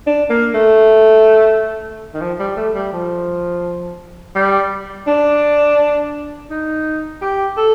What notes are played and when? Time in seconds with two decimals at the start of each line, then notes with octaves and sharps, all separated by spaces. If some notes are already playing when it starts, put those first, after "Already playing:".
0.06 D4
0.30 A#3
0.54 A3
2.14 D#3
2.20 F3
2.39 G3
2.56 A3
2.75 G3
2.92 F3
4.35 G3
5.07 D4
6.50 D#4
7.21 G4
7.57 A4